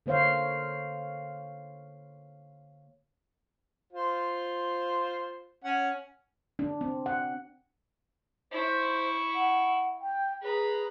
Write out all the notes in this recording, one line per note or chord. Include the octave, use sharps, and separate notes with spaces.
D3 A#3 C5 C#5 F5
F4 C5
C#4 F#5
D4
C4
F#5
E4 C5 C#6
F#5
G5
G#4 B4 A#5